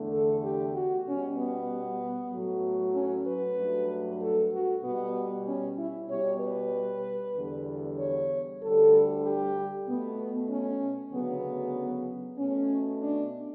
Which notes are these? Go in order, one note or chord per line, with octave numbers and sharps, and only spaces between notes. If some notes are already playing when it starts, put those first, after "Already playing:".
Already playing: E2 D3 A3
A4
G4
F#4
B2 G3 C#4
B3
A2 F#3 A3
C#4
B4
G2 F#3 A3
A4
F#4
B2 G3 B3
C#4
E4
B2 G3 C#5
B4
E2 D3 G3
C#5
D2 D3 G3 A4
G4
B2 A3 B3
C#4
D2 C#3 F#3 B3
B2 A3 C#4
D4